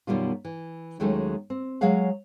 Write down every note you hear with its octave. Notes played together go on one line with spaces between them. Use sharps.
F#2 B2 D#3 G3 F4
E3
D#2 D#3 F#3 G#3 A3 C#4
C4
F#3 G#3 G#4 C#5 F5 F#5